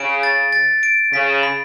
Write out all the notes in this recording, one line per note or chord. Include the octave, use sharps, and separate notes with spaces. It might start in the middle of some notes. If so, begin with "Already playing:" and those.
Already playing: C#3 D7
A6
A6
D7
C#3 B6
B5